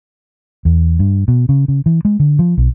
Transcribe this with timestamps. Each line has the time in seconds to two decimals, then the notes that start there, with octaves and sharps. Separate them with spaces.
0.65 E2
0.99 G2
1.28 B2
1.49 C#3
1.68 C#3
1.86 E3
2.05 G#3
2.20 D3
2.39 F3
2.57 B1